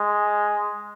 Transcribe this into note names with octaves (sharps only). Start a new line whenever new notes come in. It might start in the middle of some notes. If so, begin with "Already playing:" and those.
Already playing: G#3